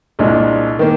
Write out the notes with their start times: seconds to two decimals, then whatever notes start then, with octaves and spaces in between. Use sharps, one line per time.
0.19 C2 A#2 G#3 D4
0.79 D#3 A#3